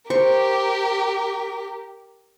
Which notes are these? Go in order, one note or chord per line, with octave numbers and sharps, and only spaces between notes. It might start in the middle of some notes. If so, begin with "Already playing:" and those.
G4 A#4 C5 C#6